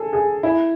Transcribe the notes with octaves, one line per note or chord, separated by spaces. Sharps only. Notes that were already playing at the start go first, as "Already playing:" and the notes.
Already playing: G#4 A4
G#4
E4